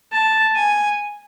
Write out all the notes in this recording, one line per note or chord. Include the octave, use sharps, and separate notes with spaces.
A5
G#5